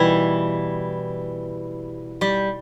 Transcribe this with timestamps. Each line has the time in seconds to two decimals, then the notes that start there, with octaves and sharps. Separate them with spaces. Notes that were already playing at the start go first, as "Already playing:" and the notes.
Already playing: B2 E3 G3 E4 G4
2.21 G3 G4